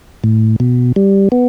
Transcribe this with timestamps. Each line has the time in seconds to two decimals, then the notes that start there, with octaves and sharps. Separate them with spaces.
0.24 A2
0.60 B2
0.96 G3
1.32 B3